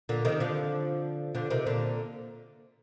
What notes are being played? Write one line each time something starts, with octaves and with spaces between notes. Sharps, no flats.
A#2 D3
C3 D#3
D3 F3
D3 F3
C3 D#3
A#2 D3